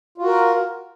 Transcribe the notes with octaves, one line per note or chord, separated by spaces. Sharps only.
F4 F#4 A#4